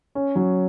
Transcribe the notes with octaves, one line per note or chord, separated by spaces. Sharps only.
C#4
F#3